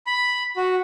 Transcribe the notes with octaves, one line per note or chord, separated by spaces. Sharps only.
B5
F#4